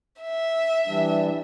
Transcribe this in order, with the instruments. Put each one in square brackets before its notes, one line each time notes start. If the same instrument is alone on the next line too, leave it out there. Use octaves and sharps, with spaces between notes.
[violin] E5
[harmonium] E3 G3 D4